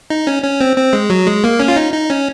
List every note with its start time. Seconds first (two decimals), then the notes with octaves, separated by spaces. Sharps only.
0.10 D#4
0.27 C#4
0.43 C#4
0.61 C4
0.77 C4
0.93 G#3
1.10 F#3
1.27 G#3
1.44 A#3
1.60 C#4
1.68 F4
1.76 D#4
1.93 D#4
2.10 C#4